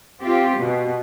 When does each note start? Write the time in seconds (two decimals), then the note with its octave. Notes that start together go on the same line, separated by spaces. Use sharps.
0.21 C4 F4 G4
0.57 B2